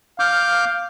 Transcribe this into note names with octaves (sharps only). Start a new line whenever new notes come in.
F5 D6 F6 G6